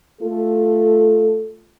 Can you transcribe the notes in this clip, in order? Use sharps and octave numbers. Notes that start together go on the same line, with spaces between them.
A3 F4 A4